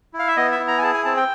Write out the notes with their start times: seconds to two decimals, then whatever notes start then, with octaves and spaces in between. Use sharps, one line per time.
0.14 E4
0.19 F5
0.28 E5
0.36 B3 D#5
0.52 E5
0.59 E4
0.68 A#5
0.78 G#5
0.83 G#4 A5
0.94 G#5
1.05 C4 A5
1.17 G5